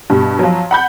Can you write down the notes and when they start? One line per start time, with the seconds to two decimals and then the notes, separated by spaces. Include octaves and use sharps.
0.10 G2 B2 G3
0.39 F3 F#3
0.71 F#5 B5 G6